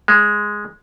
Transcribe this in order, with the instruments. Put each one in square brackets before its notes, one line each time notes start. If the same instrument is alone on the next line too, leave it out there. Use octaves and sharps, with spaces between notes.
[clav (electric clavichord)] G#3